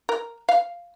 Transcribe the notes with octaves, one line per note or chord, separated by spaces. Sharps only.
A#4
F5